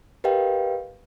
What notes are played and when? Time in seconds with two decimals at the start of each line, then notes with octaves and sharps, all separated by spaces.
0.24 G4 A#4 B4 D#5 F5 G5